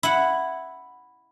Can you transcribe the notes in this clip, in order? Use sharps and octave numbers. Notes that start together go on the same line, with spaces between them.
E4 F#5